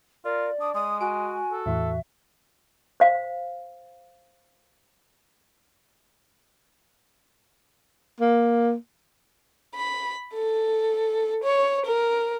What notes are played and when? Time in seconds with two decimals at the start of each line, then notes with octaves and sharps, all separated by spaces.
0.25 F4 A#4 D5
0.60 D4 D#6
0.74 G#3 D#6
1.01 F#4 G#5 D7
1.51 A4
1.66 E2 A2 E3 E5
3.00 C5 F5
8.20 A#3
9.75 B5
10.34 A4
11.44 C#5
11.86 A#4